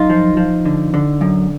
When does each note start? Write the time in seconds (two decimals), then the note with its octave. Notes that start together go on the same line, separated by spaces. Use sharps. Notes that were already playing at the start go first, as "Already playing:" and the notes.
Already playing: F#2 D#4 F4
0.10 F3
0.37 F3
0.65 D3
0.94 D3
1.21 F#2